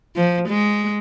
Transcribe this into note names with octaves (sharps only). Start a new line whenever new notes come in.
F3
G#3